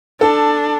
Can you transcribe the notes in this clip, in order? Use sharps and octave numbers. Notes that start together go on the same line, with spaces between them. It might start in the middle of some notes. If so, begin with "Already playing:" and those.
D4 A4